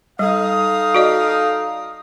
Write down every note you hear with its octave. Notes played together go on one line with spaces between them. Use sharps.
G3 D#4 A4 F5 D#6
F#4 D5 D#5